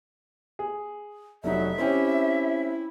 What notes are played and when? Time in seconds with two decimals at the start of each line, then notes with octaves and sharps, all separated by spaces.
0.59 G#4
1.44 F1 F#3 D#4 E5
1.78 C4 C#4 E4 G4